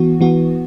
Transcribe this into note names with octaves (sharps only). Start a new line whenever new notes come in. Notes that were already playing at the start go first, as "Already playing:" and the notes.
Already playing: E3 B3 F#4
E3 B3 F#4